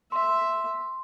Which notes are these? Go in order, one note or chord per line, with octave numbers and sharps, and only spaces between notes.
E5 C6